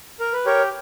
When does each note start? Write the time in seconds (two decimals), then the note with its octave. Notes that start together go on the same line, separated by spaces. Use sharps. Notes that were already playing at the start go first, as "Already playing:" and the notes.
0.20 A#4
0.33 B4
0.46 G4 A#4 C#5